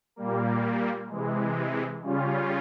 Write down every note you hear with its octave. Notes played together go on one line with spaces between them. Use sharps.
A#2 G3 A#3
C3 E3 G#3
C#3 G3 C#4 F4